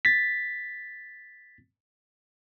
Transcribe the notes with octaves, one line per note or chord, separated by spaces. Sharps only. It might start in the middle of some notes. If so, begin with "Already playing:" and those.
A6 B6